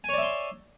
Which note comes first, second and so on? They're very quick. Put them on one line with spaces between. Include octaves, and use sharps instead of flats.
G#5 C#5 D5 E5 C6